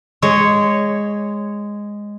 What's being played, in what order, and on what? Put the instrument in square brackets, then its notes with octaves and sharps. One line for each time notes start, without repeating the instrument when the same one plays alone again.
[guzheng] G#3 C#5